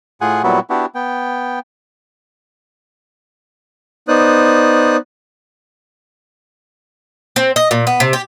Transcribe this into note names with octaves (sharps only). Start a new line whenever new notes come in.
A2 F4 G#4 F#5 G#5
A#2 F#3 G3 B3 E4 F#4
B3 D4 E4 F#4 G4
B3 G5
B3 D#4 C5 D5 D#6 F#6
C4
D#5
A#2
B3
C3
G4